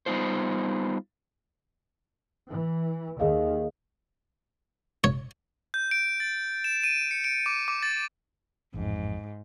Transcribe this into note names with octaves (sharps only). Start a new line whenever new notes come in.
G3 B3 D#4 F4 C5
E3
D#2 D#3 G#4 D#5 F5
C#5
G6
D7
A6
E7
D#7
C#7
D7
D6
D6
A6
A1 F2 G#2